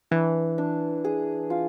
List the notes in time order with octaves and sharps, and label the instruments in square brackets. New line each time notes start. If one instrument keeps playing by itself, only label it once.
[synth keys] E3 [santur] D4
[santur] D4
G#4
F4